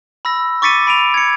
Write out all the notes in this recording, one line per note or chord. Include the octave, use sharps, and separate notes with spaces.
B5 E6 A#6
C#6 D6 A6 B6 C#7 D#7
B5 D7 D#7 F7
G#6 C#7